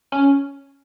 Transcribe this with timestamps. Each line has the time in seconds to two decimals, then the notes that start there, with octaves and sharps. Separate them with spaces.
0.12 C#4